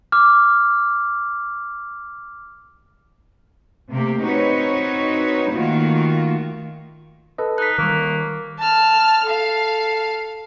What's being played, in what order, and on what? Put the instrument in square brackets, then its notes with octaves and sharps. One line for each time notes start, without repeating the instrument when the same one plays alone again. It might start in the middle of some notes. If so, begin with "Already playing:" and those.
[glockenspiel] D6 F6
[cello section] C3 A3 A#3 G4
C4 D#4 F#4 B4 C#5
D#3 A3 A#3 F4 F#4
[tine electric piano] A4 B4 D#5
[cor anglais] D#4 [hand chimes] F#6 B6
[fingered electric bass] D#3 G3 [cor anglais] A#3 [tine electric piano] A#4 C#6
[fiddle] A5 F6
A4 F5